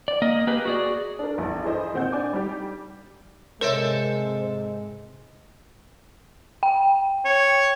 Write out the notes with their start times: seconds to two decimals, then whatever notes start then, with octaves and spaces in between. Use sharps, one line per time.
0.08 D5
0.22 A#3 D#5
0.47 A#3 G4 G#4 B4
0.65 F#4 G#4 D5
1.19 D4 A4 A#4
1.38 A#1 E2 G2
1.63 E4 G#4 A4 C5 D#5
1.93 G#1 A#2 C4 F#5 G6
2.12 D4 G#5 D6
2.33 G3 D#4 G4
3.61 G#2 C3 G#3 A4 A#4 C5 C#5 E5
6.63 G5
7.25 C#5